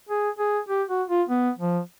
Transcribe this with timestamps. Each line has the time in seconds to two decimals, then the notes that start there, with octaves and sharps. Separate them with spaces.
0.09 G#4
0.39 G#4
0.69 G4
0.89 F#4
1.09 F4
1.29 B3
1.59 F3